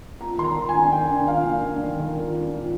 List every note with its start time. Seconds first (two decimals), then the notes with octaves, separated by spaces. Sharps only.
0.20 F4 A#5
0.38 D#3 C6
0.44 A#5
0.56 F4
0.69 G#5
0.74 D4
0.92 D#3 G5
1.10 D4
1.27 F4 F5
1.45 A#3
1.64 D4
1.82 D#3
1.99 D#3
2.18 F4
2.35 D4
2.54 F4